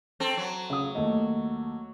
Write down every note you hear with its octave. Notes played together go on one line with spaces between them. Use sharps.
C4 A4
F#3
C#3 D#6
D#2 A3 D#5